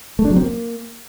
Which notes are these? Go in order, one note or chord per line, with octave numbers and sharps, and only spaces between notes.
A3
D4
F#3
C4
A#3